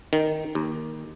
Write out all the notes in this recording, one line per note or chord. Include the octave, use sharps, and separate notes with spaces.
D#3
D#2